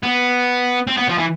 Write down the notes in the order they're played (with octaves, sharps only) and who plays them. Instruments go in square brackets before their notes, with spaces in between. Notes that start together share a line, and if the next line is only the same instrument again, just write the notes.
[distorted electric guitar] B3
C4
B3
F3
E3